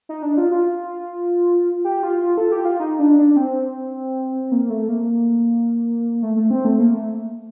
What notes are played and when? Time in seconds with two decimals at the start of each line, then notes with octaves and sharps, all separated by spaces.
0.09 D#4
0.23 D4
0.38 F4
0.51 F4
1.84 G4
2.03 F4
2.22 F4
2.37 A4
2.52 G4
2.65 F4
2.80 D#4
2.99 D4
3.18 D4
3.31 D4
3.36 C4
4.52 A#3
4.70 A3
4.89 A#3
6.22 A3
6.37 A3
6.51 C4
6.65 A3
6.80 A#3
6.94 A3